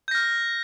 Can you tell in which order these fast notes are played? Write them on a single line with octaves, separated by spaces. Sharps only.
G6 A#6 F6